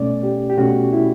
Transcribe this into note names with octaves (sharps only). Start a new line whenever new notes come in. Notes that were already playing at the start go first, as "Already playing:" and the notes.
Already playing: B2 A3 C#4 D5
G4
G4
B2 A3 C#4 F#4
E4